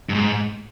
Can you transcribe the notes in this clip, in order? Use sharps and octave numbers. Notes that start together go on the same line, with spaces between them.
G2
G#2